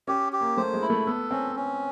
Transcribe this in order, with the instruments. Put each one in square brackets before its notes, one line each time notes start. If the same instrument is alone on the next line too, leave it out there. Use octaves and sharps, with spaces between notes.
[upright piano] C#4 [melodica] G4
[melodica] G4
[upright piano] A#3
[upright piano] A3 [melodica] C5
[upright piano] G#3
[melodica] E4
[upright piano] A3
[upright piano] B3 [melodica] A4
[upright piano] C4 [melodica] C#4
[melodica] C#4